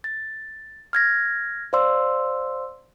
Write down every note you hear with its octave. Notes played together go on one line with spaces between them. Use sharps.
A6
F6 G#6 A#6
C5 D5 F5 C6 E6